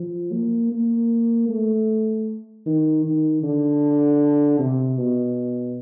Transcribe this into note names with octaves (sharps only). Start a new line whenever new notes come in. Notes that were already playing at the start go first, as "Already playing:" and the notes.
Already playing: F3
A#3
A#3
A3
D#3
D#3
D3
C3
B2